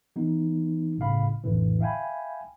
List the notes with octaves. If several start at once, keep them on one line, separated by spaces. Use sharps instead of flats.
E3 B3 D#4
G1 A2 C#3 F5 B5
A#1 F2 A2 D3 E3
E5 F5 G5 G#5 B5